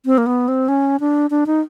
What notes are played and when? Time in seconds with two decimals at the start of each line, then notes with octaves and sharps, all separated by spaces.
0.06 C4
0.18 A#3
0.26 B3
0.48 C4
0.68 C#4
1.00 D4
1.30 D4
1.47 D#4